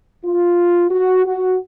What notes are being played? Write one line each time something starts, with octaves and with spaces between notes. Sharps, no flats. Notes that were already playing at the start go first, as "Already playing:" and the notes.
F4
F#4
F#4